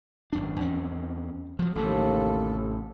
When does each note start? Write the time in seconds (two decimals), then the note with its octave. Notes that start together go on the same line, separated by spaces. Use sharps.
0.33 G#1 F#2 D4
0.60 E2 C4 C#4
1.59 F3 F#3
1.75 A1 D#2 A2 C3 A4